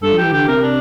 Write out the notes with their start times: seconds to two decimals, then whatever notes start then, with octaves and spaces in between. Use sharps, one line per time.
0.02 G2 A4
0.13 F3
0.18 G4
0.23 E3
0.33 D3 G4
0.48 C3 A#4
0.62 D4